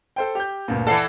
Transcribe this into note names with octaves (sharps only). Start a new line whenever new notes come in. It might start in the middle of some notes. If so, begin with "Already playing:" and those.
A4 C5 G5
G4 G6
D2 G2 A#2
E3 A4 D5 F#5 C7